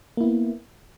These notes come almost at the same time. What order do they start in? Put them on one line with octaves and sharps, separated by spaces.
A#3 E4 B3